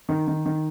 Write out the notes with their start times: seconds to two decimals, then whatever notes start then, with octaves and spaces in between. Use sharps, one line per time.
0.09 D#3
0.27 D#3
0.46 D#3